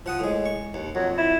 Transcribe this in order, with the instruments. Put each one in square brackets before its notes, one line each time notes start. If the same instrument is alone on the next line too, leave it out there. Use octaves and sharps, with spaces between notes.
[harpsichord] F3 F#5 D#6
A2 G#3
C#6
D#2
[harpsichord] F2 [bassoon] F#3
[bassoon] E4